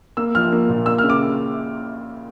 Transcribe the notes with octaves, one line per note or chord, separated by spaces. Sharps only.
A#3 E6
F3 F6
A#3
A#2
A#3 E6
F6
C#3
D6